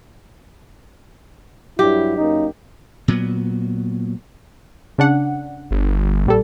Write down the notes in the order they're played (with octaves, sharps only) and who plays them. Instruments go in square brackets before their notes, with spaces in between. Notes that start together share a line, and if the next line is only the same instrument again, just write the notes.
[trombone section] G2 F#3 E4 [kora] G4
[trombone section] F#2 A#3 D#4
[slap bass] A#2 F#3 B3
[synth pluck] C#3 D4 F#5
[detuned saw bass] G1
[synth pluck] A#1 G3 A4